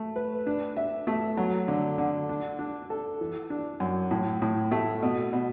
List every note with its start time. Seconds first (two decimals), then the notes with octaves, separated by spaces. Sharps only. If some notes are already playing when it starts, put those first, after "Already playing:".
Already playing: A3
0.16 B4
0.47 D4
0.77 E5
1.07 A3
1.37 F#3
1.68 D3
1.98 D3
2.29 D4
2.59 D4
2.90 A4
3.21 E3
3.50 D4
3.80 F#2
4.11 A2
4.42 A2
4.71 A3
5.03 B2
5.33 B2